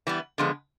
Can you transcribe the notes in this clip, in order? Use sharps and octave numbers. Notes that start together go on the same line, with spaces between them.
E3 G3 B3
D3 F3 G#3 B3